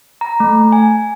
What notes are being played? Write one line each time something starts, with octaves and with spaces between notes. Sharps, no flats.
A#5
A3
G#5